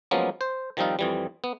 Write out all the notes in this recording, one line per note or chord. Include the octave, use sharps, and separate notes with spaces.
F3 F#3 G#3 A#3 B3 C#4
C5
D#3 F3 G3 C4 D#4 F4
F2 E3 G3
B3